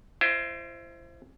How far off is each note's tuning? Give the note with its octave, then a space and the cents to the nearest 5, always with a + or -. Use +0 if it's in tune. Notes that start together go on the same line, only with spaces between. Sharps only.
E4 +40 C5 +0 D#5 +5